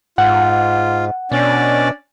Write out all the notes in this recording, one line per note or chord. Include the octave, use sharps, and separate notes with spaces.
G#2 F4 F#5
B2 C#4 D4 D5